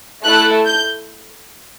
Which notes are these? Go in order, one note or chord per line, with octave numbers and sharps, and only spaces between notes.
A3 E4 A4 F#6
G6